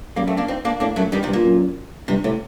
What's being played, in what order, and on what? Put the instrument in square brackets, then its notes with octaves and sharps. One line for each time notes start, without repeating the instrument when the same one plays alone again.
[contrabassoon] F#2 [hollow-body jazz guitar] G3 A#3
[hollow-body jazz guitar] A3 C4
A#3 D4
C4 D#4
A#3 D4
[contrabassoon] A2 [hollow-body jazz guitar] A#3 D4
[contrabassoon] F#2 [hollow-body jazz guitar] F#3 A3
[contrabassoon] G2 [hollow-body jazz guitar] D#3 G3
[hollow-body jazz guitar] C3 D#3
[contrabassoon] G2
[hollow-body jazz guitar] A#2
[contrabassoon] F#2
[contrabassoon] G2 [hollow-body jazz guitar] C3
[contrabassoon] A2 [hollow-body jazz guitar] C3